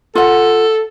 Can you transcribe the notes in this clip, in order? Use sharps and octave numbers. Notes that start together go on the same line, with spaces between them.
F4 A4 F#5